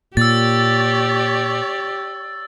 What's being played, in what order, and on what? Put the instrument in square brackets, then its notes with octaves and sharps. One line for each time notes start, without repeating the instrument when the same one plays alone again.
[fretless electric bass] A#2 [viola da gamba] G4 [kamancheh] C#5 D5 [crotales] E6 A6